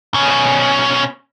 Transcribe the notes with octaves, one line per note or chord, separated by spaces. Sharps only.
B2 C#4